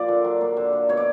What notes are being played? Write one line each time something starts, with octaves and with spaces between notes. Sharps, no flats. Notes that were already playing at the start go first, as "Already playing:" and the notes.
Already playing: A#2 F3 D5
D3
F#3
A#3
D3
D3
B2 C#5
D5